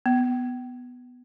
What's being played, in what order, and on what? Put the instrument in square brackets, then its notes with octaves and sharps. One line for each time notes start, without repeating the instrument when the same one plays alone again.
[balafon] B3